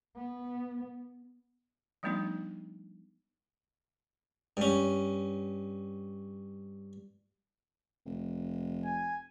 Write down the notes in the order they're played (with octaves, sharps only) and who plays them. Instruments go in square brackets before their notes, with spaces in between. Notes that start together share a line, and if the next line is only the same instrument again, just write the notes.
[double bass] B3
[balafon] F3 G3 A3 B3 D4 D#4
[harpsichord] G2 C#4
[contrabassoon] F1
[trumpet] G#5